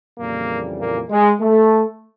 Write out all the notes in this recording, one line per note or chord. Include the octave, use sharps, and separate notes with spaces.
F2 A#2 C#3 E3 G3 A#3
A#2 A#3
G#3
A3